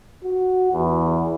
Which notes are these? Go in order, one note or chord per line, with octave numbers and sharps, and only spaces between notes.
F#4
E2